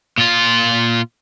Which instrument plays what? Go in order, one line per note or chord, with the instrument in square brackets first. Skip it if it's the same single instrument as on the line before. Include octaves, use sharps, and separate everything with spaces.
[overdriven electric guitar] A#2 F4